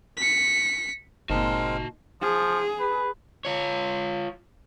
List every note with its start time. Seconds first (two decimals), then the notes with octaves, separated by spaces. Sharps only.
0.17 B6 C#7
1.30 G1 A#2 G#3 C4 D#4 F#4 A#4 A5
2.22 F3 G#4
2.80 B4
3.45 F4 C#5